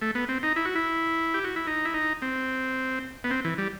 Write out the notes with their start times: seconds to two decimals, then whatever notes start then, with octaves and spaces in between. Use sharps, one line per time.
0.02 A3
0.15 B3
0.29 C4
0.43 D#4
0.56 E4
0.65 F#4
0.75 E4
1.34 G4
1.44 F#4
1.56 E4
1.67 D#4
1.85 E4
1.94 D#4
2.22 C4
3.24 B3
3.31 C4
3.45 E3
3.58 G3